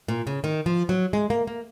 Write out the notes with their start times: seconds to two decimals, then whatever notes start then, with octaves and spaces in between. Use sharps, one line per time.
0.08 A#2
0.27 C#3
0.44 D#3
0.66 F3
0.89 F#3
1.13 G#3
1.30 A#3
1.47 A#3